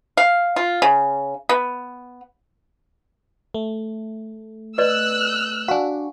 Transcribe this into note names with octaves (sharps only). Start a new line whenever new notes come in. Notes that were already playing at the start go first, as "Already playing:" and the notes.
F5
F4
C#3
B3
A3
B4 D5 D#5 E6 F#6
D4 F#4 F5 G#5